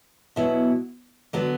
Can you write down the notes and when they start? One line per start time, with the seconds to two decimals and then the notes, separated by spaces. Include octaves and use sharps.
0.36 B2 F#3 B3 E4
1.33 D3 F#3 B3 D5